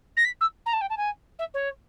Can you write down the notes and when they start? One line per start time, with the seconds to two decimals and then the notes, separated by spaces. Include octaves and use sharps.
0.17 A#6
0.25 B6
0.41 E6
0.66 A#5
0.73 A5
0.81 G5
0.90 A5
0.97 G#5
1.39 E5
1.54 C#5